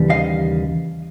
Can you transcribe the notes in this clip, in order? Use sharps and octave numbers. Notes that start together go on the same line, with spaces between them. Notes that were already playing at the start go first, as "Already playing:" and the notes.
Already playing: D#2 C#3 E3 G3
D#5 F5